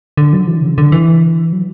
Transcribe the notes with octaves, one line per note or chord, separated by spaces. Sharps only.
D3
F#3
E3
C#3
D3
E3
F#3